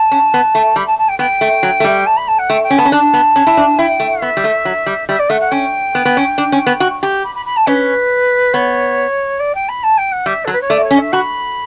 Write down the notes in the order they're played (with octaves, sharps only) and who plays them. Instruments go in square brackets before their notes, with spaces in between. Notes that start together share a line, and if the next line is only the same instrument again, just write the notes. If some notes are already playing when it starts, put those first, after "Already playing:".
Already playing: [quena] A5
[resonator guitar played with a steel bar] C#4
B3
A3
[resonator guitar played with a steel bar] G3 [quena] B5
[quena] A5
A5
G5
[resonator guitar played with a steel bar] B3 [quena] G5
[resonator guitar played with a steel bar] A3
F#3
A3
G3
[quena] A5
B5
A5
F#5
[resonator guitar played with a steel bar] A3 [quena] G5
[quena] G5
[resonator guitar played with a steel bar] C#4
[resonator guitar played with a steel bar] B3 [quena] A5
[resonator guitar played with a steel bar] C#4
[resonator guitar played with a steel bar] D4 [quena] A5
[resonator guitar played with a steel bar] B3
C#4
E4
D4
[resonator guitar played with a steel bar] E4 [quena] G5
[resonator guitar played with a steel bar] A3
[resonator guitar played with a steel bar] B3 [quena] E5
[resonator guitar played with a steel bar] G3
A3
F#3
G3
[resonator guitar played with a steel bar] G3 [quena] E5
[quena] D5
[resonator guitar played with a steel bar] A3 [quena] F#5
[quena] F#5
[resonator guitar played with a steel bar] C#4 [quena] G5
[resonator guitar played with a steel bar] B3
B3
C#4
D4
C#4
B3
F#4
G4
[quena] B5
B5
B5
A5
[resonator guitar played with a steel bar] C#4 [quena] B4
[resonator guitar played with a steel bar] B3 [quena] C#5
[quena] D5
G5
B5
A5
G5
F#5
[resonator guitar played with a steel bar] G3 [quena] E5
[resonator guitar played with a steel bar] F#3 [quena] A4
[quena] B4
C#5
[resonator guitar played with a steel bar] A3 [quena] D5
[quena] C#5
[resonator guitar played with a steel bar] C#4
[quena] E5
[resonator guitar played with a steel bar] F#4 [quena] B5